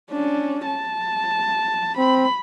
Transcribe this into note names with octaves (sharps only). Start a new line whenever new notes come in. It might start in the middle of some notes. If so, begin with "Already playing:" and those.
C#4 D4
A5
C4 B5